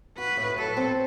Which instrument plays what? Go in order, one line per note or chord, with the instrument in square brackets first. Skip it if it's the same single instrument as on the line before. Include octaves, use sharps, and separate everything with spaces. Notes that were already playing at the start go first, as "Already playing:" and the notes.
[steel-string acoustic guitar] F#4 [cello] B4
[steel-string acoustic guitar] A2
[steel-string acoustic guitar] F#3 [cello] A4
[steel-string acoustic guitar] C4